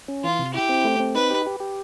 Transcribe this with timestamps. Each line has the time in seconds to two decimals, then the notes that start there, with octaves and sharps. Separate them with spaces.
0.08 C#4
0.24 E3 F4
0.39 C3
0.54 E4 G4
0.69 C4
0.84 A3
1.00 C4
1.15 D#4 B4
1.30 G4
1.46 G4
1.60 G4